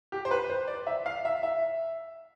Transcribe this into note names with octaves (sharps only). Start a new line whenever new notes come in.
G4
C5
B4
C5
D5
E5
F5
E5
E5